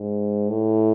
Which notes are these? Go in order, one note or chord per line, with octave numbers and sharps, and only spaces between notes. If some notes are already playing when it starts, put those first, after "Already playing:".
Already playing: G#2
A2